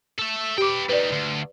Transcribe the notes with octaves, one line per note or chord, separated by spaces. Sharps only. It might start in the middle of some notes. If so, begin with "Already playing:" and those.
A4 E5
G4 B4 G5 D6
G3 D#4 B4 D5
D2